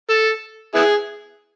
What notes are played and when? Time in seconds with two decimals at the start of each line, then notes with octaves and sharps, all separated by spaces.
0.09 A4
0.75 B3 E4 G#4